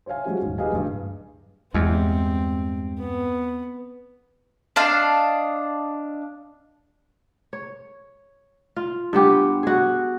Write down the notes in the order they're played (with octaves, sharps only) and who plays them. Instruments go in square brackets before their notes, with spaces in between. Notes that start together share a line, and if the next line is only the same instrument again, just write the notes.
[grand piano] C5 C#5 E5 F5 G#5
F3 F#3 G#3 C#4 F#4 G4
D#1 G#2
G4 G#4 B4 D#5 F5 G#5
D1 G2
[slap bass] E2 [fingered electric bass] G2 G#3 [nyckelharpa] C4
[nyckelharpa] B3
[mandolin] D4 D#5 F5 A5
[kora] C#5
F4
G2 B3 G4 G5
F#4 G#4